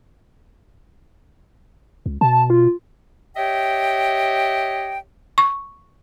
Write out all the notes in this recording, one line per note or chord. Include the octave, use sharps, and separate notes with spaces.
C#2
B2 A5
F4
G4 C#5 D#5 E5 G5
C#6